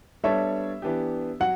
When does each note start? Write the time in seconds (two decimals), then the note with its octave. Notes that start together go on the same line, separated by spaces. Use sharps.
0.24 G3 B3 D4 A4 C#5 E5
0.82 E3 B3 D4 G4
1.40 F#3 F#5